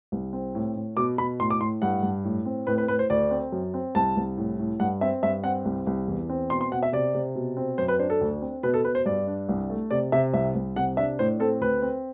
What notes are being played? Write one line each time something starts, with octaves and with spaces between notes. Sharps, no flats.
C2
C4
A2
A2
B2 D6
B2 B5
A2 C6
D6
A2 C6
G2 F#5
G2
A2
C4
A2 B4
B4
A2 B4
C5
D2 D5
C4
F#2
C4
C2 A5
C2
A2
A2
G2 F#5
C4 E5
G2 E5
C4 F#5
C2
C2
E2
C4
B2 C6
C6
B2 F#5
E5
C3 D5
C3
B2
C4
F#2 C5
B4
D4 C5
A4
D2
C4
B2 B4
A4
B2 B4
C5
G2 D5
D4
C2
A3
C3 D5
C3 E5
C2 E5
C2
C3 F#5
D4 E5
A2 C5
C4 A4
D2 B4
C4